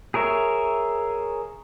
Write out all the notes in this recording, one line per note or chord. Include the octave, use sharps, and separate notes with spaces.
G#4 A#4 C#5 E5